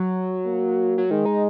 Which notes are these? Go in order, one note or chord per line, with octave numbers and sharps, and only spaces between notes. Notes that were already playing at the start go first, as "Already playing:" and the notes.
Already playing: F#3
A#3
F#3
D#3 G#3
D#4